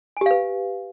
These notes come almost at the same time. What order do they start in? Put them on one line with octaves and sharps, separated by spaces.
G#5 G4 F5 B4